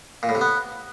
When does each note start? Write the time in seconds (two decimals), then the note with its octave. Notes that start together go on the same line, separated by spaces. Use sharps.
0.23 A#2
0.29 A2
0.35 C3
0.41 B3